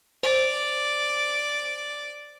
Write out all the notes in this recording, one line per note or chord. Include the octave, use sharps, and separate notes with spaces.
C5 D5